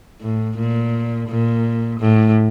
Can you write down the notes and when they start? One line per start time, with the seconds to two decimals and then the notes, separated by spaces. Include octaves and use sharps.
0.22 A2
0.58 A#2
1.28 A#2
2.00 A2